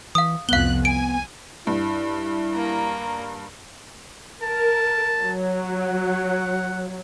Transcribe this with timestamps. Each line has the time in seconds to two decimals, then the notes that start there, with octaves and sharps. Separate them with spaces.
0.15 E3 F5 D#6
0.49 C2 F2 B3 F5 F#6 G7
0.85 G#5 D7
1.67 G2 E4
2.52 A#3 A#5
4.43 A#4 A5
5.21 F#3
5.67 F#5